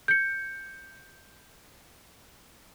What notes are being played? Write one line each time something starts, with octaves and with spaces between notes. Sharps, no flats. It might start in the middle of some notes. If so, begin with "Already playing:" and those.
G6 C#7